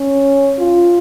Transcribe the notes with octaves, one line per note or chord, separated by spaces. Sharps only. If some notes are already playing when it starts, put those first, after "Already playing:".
Already playing: C#4
F4